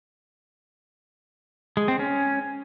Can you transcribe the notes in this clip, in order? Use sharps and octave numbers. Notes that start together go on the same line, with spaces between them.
G#3
C4
C#4